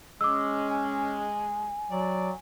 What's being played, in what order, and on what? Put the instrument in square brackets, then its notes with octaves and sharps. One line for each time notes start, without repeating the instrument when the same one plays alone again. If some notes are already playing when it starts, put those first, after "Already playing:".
[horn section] G#3 [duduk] C#4 [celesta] D6 E6
[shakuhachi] G#5
[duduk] F#3 [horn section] D5